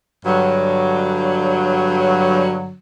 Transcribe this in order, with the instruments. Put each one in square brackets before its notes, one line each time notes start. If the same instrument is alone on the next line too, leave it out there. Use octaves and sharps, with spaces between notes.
[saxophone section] G2 D3 F#3